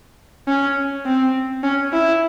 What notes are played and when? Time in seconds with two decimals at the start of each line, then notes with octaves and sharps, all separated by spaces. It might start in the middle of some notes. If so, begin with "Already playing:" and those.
0.48 C#4
1.06 C4
1.63 C#4
1.93 E4